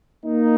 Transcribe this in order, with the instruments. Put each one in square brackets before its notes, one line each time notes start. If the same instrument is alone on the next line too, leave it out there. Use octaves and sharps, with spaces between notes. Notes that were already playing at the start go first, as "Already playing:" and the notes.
[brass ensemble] A#3 D#4